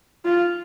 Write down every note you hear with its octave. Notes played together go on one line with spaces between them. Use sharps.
F4